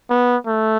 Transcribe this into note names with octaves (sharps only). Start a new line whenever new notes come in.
B3
A3